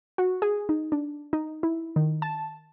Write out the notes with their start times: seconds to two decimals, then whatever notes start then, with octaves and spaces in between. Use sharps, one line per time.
0.18 F#4
0.42 G#4
0.69 D#4
0.92 D4
1.33 D#4
1.63 E4
1.96 D#3
2.22 A5